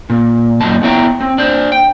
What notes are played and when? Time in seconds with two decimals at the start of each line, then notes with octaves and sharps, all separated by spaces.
0.10 A#2
0.61 F#2 A#2 D#4 A5
0.82 B3 D4 E4 C#5 G5 A#5
1.21 C4
1.38 D4 C5
1.72 G5